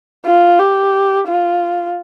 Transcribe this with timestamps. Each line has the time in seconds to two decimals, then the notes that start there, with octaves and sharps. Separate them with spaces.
0.25 F4
0.59 G4
1.28 F4